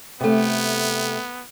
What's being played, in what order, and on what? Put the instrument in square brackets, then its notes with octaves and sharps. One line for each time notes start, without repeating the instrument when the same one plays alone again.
[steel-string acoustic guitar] C3 A3 [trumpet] B3